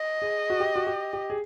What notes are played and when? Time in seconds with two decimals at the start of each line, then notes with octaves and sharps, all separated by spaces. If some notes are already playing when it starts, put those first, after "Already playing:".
Already playing: D#5
0.22 G#4
0.50 F#4
0.60 G4
0.76 F#4
0.87 G4
1.13 G4
1.30 G#4